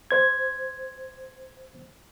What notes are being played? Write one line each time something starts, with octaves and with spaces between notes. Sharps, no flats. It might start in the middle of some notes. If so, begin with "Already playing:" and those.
C5 G#6